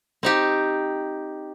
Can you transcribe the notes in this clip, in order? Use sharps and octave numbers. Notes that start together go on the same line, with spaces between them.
C4 D#4 G4